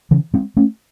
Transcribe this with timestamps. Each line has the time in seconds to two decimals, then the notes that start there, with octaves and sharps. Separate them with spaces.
0.11 C#3 E3
0.34 G#3 C4
0.57 A3 C#4